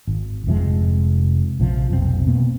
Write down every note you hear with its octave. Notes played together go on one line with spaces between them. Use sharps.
G#1
F1 C3 F3 G#3
A#1 C3 F3
F1 B1 C3 C4
B2 A#3 C4